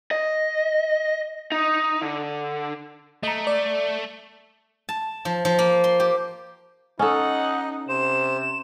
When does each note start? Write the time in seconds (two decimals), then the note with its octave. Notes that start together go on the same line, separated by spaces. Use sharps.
0.11 D#5
1.52 D#4
2.02 D3
3.23 A3 D#5 A#5
3.47 D5
4.89 A5
5.25 F3
5.45 F3
5.59 A#3
5.84 C6
6.00 G4
6.99 C#4 D#4 A4 D#5 F#5
7.89 C3 C5 E7